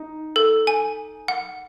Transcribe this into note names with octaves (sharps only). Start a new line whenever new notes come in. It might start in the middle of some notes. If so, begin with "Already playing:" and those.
Already playing: D#4
A4
G#5
F#5